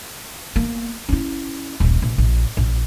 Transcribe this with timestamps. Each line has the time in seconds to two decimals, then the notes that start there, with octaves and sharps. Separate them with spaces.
0.56 A#3 B3
1.09 C#4 E4
1.80 D#1 A#1
2.02 A#1
2.18 A#1
2.57 A#1